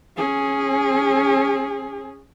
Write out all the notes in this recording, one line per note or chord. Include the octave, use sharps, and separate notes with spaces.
C#4 G#4